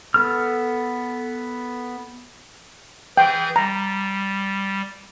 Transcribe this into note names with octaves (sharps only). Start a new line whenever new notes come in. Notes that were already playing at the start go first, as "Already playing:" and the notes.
B3 A4 F6
E3 G#4 G5 G6
G3 A#5